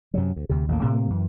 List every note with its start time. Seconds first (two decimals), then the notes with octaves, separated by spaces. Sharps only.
0.14 F#2 C3 F#3
0.36 D2
0.49 D2 C3
0.68 A1 D#2 A2 A#3
0.83 A2 C3 A#3
1.10 F#2 E3